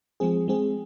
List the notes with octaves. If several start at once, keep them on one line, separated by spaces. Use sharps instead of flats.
F3 G#3 C4 G#4
G#3 C4 G#4